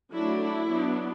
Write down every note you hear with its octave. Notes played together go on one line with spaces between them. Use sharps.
F#3 A3 D4 E4
E4
F#3 B3 D4